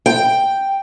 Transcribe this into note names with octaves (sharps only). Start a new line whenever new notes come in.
G5